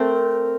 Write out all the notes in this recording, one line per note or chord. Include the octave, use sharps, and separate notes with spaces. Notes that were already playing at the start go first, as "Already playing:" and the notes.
Already playing: A3 C4 A#4